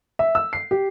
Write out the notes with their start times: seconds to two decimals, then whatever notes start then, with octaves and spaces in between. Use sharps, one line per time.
0.19 E5
0.35 E6
0.53 C7
0.71 G4